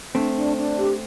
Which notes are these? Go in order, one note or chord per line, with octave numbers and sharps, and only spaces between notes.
A3 C4 D4
D4
D4
G4